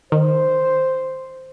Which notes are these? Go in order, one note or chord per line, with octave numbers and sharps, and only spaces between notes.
D#3 C5